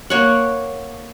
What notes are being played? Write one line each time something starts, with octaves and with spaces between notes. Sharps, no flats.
A#3 C#5 F#5